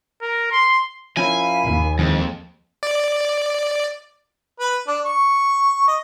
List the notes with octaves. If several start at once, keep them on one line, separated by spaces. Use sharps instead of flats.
A#4
C6
F3 C#4 E4 A#4 F5 G#5 B5
D#2
F2 D#3 E3 G#3
D5
B4
D4
C#6
D#5